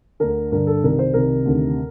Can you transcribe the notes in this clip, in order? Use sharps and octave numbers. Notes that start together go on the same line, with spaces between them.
D2 D3 A#4
G2 D3 A#4
A4
C2 C3 D#3 A#4
C5
C2 C3 D#3 A#4
D2 C3 D#3